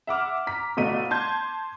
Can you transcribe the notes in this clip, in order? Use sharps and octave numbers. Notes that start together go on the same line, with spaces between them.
E5 F#5 D6 F6
A#5 B6
G1 B2 A3 D#5 D#7
A5 C6 G6 G#6